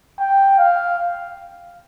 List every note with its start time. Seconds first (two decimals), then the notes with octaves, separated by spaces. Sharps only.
0.19 G5
0.58 F5